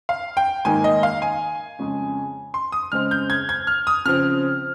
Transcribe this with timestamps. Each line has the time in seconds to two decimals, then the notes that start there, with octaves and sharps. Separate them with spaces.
0.09 F5
0.37 G5
0.65 G#2 D#3 A#3 G#5
0.84 D#5
1.03 F5
1.22 G#5
1.79 F2 C#3 G#3 C#4
2.54 C6
2.72 D#6
2.92 C#3 G#3 C4 F6
3.11 G6
3.30 G#6
3.49 G#6
3.67 F6
3.87 D#6
4.05 C#3 F3 C4 F6